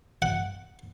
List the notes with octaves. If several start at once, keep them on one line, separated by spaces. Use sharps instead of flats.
F#5